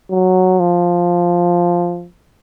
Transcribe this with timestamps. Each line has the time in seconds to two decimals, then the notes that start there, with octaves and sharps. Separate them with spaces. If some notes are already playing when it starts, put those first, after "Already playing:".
0.11 F#3
0.60 F3